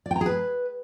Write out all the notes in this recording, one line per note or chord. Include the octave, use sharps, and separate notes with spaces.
D5
G5
A#5
G#4
B4